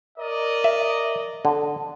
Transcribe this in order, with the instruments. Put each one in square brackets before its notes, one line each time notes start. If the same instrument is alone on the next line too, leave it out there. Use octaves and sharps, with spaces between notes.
[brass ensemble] A#4 D5 D#5
[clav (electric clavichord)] E5
D3